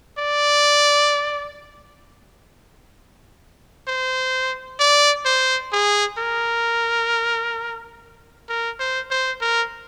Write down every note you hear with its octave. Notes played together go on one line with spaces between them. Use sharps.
D5
C5
D5
C5
G#4
A#4
A#4
C5
C5
A#4